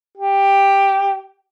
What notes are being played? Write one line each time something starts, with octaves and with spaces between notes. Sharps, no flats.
G4